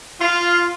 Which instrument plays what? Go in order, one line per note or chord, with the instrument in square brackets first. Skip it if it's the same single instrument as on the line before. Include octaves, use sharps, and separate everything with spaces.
[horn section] F4